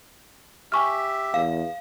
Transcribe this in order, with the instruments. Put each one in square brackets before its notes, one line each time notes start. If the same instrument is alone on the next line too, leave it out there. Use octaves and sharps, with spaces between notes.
[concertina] G4 E5 [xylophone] G#5 C#6 F6
[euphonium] E2 [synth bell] F5